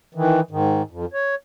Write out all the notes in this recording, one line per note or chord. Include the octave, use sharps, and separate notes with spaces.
D#3 E3
G#2 D#3
F2
C#5